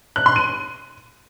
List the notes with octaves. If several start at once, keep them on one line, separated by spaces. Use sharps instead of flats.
F#6
C6
D#7